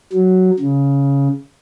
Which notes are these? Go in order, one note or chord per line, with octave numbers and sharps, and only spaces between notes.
F#3
C#3